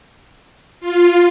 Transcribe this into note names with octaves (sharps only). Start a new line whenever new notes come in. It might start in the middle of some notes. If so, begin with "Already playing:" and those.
F4